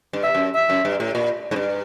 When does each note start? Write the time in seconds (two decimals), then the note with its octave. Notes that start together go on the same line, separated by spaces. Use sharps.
0.13 G2
0.23 E5
0.35 F#2
0.55 E5
0.70 F#2
0.85 G2
1.00 A2
1.15 A#2
1.51 G#2
1.56 G2